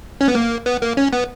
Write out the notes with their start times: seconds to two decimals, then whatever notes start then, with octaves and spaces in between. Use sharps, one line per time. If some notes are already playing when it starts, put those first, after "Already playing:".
0.21 C#4
0.28 B3
0.35 A#3
0.66 B3
0.82 A#3
0.97 C#4
1.13 B3